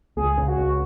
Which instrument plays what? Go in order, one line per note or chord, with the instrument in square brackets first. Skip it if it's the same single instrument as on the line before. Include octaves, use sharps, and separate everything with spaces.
[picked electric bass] C#2 [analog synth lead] G#4
[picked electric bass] C#3
[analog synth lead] F#4
[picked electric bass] C#2